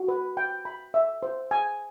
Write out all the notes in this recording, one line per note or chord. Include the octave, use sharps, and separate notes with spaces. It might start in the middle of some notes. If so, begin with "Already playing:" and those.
Already playing: F#4
B4
G5
B5
E5
C5
G#5